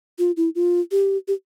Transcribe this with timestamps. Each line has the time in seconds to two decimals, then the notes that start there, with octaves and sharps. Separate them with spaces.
0.19 F4
0.37 E4
0.55 F4
0.91 G4
1.28 G4